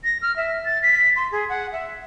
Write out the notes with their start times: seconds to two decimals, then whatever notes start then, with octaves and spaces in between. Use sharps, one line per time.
0.04 A#6
0.22 F6
0.36 E5
0.65 A6
0.82 B6
1.16 C6
1.32 G#4
1.49 F#5
1.73 E5